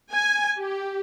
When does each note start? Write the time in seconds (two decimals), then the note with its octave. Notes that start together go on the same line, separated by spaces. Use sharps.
0.12 G#5
0.58 G4